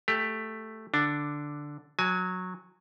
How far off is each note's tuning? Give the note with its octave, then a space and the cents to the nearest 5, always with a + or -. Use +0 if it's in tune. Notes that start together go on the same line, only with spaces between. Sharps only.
A3 +0 G4 +20
D3 +0 D4 +0
F#3 -15 G#5 +20